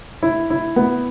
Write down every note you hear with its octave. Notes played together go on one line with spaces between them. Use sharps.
E4
E4
B3